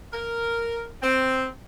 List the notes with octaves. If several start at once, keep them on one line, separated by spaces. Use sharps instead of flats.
A#4
C4